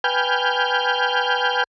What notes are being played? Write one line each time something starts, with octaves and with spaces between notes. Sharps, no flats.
B4 G5 G#5 F6 G6